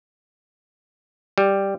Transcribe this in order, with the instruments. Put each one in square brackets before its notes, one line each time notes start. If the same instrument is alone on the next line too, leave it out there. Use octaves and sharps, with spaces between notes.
[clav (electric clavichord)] G3